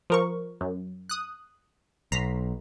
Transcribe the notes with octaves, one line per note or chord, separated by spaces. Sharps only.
F3 A#4 C#6
F#2
D#6 F#6
B1 A#5 B6 C7